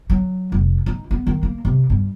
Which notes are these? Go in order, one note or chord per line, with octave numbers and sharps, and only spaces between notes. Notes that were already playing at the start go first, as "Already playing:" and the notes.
F#3
F1
D#4
B3
D#3
A#3
C3
G2